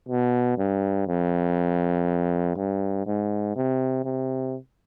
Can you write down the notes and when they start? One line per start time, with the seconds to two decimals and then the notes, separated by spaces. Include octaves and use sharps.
0.08 B2
0.58 G2
1.07 F2
2.56 G2
3.06 G#2
3.56 C3
4.04 C3